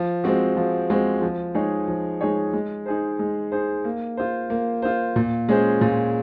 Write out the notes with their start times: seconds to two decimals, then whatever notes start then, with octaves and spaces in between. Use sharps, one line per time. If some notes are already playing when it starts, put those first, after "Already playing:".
Already playing: F3
0.24 G#3 C4 F#4
0.57 F3
0.90 G#3 C4 F#4
1.22 F3
1.55 G#3 D#4 G#4 C#5
1.88 F3
2.21 G#3 D#4 G#4 C#5
2.53 G#3
2.86 D#4 G#4 C5
3.19 G#3
3.52 D#4 G#4 C5
3.84 A#3
4.17 F4 C5
4.50 A#3
4.82 F4 C5
5.16 A#2
5.49 G#3 C#4 G#4 C5
5.81 A#2